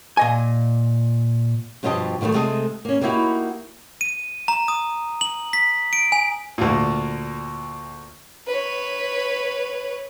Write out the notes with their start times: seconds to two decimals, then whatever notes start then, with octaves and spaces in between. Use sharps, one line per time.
0.17 A#2 D#5 G#5
1.83 G2 B2 F3 G4 D#5 A5
2.21 B2 D#3 F3 G3 A3
2.34 C3 G#3 A3 G#4 A4 D#5
2.85 A#3 C#4
3.01 G3 A#3 D#4 E4 F#4 G4
4.01 D#7
4.48 A#5
4.68 D#6
5.21 F#7
5.53 B6
5.93 D7
6.12 G#5
6.58 D2 A#2
8.47 B4 C#5